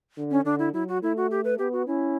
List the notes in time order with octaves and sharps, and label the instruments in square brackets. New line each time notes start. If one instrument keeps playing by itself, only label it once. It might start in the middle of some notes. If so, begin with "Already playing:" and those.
[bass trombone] D3
[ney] C#4
[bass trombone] D3 [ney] D4
[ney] E4
[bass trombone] F#3 [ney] E4
[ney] F#4
[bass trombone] A3 [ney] E4
[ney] F#4
G4
B4
[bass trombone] B3 [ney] G4
[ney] F#4
[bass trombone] C#4 [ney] E4